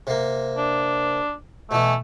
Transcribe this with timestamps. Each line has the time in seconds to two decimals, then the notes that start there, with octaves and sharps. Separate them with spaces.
0.07 C3 A#3
0.57 D4
1.71 B2 E3 A3